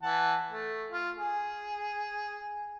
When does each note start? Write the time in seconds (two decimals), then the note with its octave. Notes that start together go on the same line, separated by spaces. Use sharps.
0.03 E3 F#5 A5
0.51 A3
0.91 F4
1.17 G#4